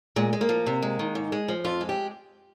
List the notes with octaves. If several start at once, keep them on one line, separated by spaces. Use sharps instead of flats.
A#2 G#3
G#3
A#3
F3
C3
G#3
D#3
G#2
G#3
F3
F2 F4
G#3
G4